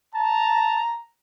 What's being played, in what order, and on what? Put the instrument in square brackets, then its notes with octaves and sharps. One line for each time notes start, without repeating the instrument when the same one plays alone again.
[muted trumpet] A5 [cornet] A#5